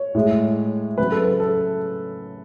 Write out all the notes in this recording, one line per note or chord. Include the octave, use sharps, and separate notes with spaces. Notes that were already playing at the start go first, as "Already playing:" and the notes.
Already playing: C#5
A2 G#3
C#3 F#3 B4
A4
B4
A4